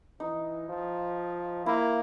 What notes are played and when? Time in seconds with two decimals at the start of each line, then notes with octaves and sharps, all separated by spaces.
0.20 E3 D#4
0.69 F3
1.66 A#3 E4